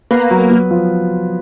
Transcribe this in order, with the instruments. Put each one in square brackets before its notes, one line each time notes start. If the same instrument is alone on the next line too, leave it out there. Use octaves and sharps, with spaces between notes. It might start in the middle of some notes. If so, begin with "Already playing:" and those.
[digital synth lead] A#3 [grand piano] B3 B4
[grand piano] F#3 F#4
F#3 F#4
F3 F4